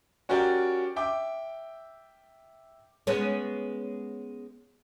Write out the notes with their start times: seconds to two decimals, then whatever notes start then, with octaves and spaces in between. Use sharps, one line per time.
0.29 C#4 F#4 G4 A#4 D5 G5
0.96 E5 G5 D6
3.07 G#3 B3 C#4